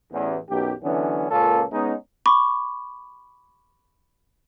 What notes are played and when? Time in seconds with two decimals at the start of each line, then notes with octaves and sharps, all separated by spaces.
0.13 A1 E2
0.50 B1 F#2 G4
0.83 D3 E3 F#3 B3 C#4
1.30 C#2 A#2 A#3 C#4 F4 A4
1.72 G#3 B3 C#4 D#4
2.26 B5 C#6 D6